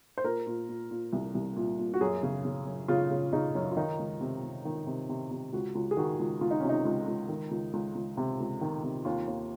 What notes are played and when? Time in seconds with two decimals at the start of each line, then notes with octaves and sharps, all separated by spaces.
0.18 C5
0.24 A#2 A#4
0.47 A#2
0.69 A#2
0.91 A#2
1.13 C2
1.35 C2
1.56 A#2
1.78 A#2
1.94 F#4
2.01 F#2 G#4
2.23 C#3
2.45 C#3
2.66 F#2
2.88 C#3 F4
3.11 C#3
3.33 C#3 D#4
3.55 F#2
3.72 F4
3.77 D#3 D#4
3.99 C#2
4.21 C3
4.43 C3
4.65 D#3
4.86 C3
5.09 C3
5.31 C3
5.53 C#2 F#4
5.75 C#2
5.91 G#4
5.97 D#3 F#4
6.19 C#2
6.41 C#2 F4
6.51 D#4
6.60 C3 C#4
6.69 D#4
6.85 C#2
7.08 C#2
7.29 D#3
7.51 C#2
7.73 C#2
7.95 C#2
8.17 C3
8.40 C#2
8.61 D#3
8.84 C3
9.05 D#2 F4
9.27 D#2